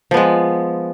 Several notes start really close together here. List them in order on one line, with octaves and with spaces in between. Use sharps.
F3 B3 G#3